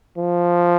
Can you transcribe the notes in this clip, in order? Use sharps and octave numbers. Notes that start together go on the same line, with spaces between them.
F3